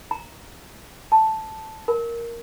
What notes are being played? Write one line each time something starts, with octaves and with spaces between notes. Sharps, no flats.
A#5
A5
A#4